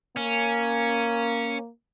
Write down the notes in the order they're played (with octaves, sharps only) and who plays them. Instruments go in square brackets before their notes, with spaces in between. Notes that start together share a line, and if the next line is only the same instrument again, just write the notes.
[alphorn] A#3 [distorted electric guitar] C#4